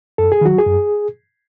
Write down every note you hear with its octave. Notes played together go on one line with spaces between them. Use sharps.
F#2 A4
G#4
D#3 F#3 F#4
G#4
F#2